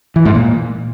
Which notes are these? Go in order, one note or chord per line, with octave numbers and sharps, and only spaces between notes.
E3
G#2
A#2